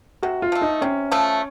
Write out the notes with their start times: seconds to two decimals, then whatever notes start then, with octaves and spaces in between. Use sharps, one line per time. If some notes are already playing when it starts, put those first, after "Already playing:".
0.23 C3 F#4
0.42 F4
0.52 F3 A3
0.61 D#4
0.81 C3 C#4
1.12 F3 A3